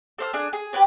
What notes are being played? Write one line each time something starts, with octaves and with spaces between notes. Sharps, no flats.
A4 C5 F6
D4 G#4
G#4
G4 A#4 B4 C#5